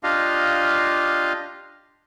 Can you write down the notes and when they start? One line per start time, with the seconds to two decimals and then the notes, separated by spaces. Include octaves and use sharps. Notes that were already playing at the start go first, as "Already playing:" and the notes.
0.03 D4 F4 G4 D#5 F5